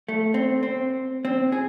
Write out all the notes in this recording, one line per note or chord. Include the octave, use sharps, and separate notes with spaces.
A3
C4
C4
C4
G#4